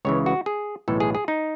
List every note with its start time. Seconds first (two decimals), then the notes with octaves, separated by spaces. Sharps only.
0.05 C#2 C#3 E3 C#5
0.26 F#4
0.46 G#4
0.88 B1 A2 E3 A4
1.00 G#4
1.15 G#4
1.28 D#4